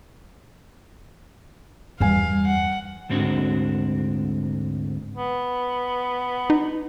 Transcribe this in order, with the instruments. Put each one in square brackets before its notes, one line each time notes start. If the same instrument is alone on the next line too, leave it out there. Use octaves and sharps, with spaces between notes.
[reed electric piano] E2 G#5 [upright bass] G2 G3 [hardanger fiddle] F5
[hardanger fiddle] F#5
[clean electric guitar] D2 G#2 C4 D4 F#4
[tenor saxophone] B3
[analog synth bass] D#4